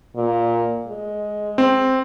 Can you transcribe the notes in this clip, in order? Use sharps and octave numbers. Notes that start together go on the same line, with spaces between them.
A#2
G#3
C4